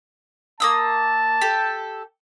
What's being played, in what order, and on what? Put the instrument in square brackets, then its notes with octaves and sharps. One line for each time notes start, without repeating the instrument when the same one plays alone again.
[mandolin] A#3 D#6 E6 [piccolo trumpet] A5
[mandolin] G4 A4